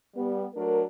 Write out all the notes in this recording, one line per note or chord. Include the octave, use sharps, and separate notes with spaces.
G3 B3
F#3 A3 D4 A#4